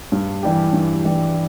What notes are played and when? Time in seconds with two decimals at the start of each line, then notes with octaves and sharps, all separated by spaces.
0.12 G2
0.43 E3 G3 D4 G4
0.73 G2
1.05 E3 G3 D4 G4